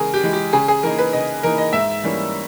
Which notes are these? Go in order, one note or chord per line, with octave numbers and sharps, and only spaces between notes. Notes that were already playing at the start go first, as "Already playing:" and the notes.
Already playing: C#3 E3 G#3 G#4 A#4
G4
E3 G#3
G4
C#3 G#4
G#4
E3 A#3 D#4 A#4
B4
C#3 D#5
E3 A#3 D#4 A#4
D#5
G#2 E5
E3 G3 A#3 C#4